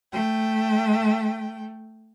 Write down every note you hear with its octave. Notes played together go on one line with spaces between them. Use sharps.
A3 G5